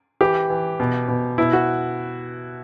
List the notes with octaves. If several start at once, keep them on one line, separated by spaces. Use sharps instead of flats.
E3 G4
E3
B2
B2
B2 E4
F#4